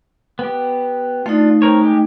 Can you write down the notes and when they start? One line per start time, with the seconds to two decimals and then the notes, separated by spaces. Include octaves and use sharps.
0.39 B3 G4
1.26 A3 D4 D#4 F4
1.62 C4 A#4 C#5
1.81 G#3 G4